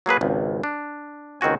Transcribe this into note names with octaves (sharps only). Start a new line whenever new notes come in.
F#3 A#3 G#4 B4
G#1 C#2
D4
C#2 D#3 C4 F#4 G#5